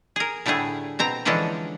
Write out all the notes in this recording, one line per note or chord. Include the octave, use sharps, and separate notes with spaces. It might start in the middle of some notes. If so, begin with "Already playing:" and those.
G#4 A#4
A2 D3 G3 A3 G#4
B2 C4 A#5
D3 E3 F3 G#3 C#4 D4